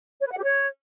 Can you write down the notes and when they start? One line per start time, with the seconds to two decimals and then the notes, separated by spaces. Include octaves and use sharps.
0.20 C#5
0.26 B4
0.32 F#5
0.37 G4
0.43 C#5